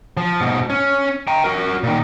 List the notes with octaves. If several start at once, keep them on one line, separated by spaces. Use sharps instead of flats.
F3
G#2 B2
C#4
G5 A#5
F#4 A#4
A#2 D#3